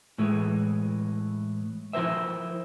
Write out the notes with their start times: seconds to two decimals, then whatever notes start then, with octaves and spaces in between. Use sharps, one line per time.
0.18 A2 E3 G#3
1.93 F3 E4 A#4 C5 E5